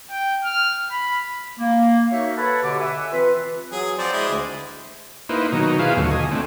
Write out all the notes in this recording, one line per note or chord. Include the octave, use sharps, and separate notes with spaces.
G5
F6
B5
A#3
D#4 F#4 A#4 C#5 E5
A4 B4 C#5 F#5 A5 B5
B2 D3 G4 C#5 D6
E5 F#5 G#5
E3 C4 F4 B4
F#3 G#4
F3 C4 C5 D5
G#3 E4
D2
A#3 D#4 E4 B4 C5
B2 D#3 F#3 D#4
E4 F4 G#4 B4 C5 F5
D#2 B2 D3 F#3 A3
D#5 G#5
A3 C4 D4